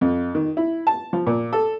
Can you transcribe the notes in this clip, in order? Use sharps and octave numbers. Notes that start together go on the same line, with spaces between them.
F2
D#3
E4
A5
F3
A#2
A4